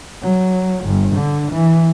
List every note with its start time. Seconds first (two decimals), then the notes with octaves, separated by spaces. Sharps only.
0.22 F#3
0.85 G1
1.15 D3
1.52 E3